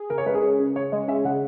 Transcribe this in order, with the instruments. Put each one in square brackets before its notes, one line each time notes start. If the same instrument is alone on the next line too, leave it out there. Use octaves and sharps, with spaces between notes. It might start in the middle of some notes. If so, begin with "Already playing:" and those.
Already playing: [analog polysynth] G#4
[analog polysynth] C#3 [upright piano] A#4
[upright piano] C#5
[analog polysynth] G#3 [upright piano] B4
[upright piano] G#4
[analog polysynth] C#4
C#3
[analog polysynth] C#3 [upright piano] C#5
[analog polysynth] G#3 [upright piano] D#5
[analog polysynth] C#4 [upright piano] E5
[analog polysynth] C#3 [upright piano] F#5